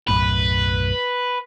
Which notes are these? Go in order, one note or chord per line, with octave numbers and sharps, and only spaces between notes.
B1 F#2 A2 B4